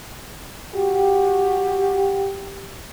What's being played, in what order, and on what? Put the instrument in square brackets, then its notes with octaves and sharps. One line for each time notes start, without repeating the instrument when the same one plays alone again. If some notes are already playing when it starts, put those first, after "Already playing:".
[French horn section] F#4 G4